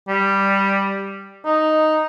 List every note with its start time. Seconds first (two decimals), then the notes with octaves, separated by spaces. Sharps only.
0.08 G3
1.45 D#4